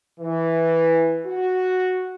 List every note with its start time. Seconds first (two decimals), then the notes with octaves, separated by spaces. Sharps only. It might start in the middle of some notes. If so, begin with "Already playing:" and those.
0.20 E3
1.25 F#4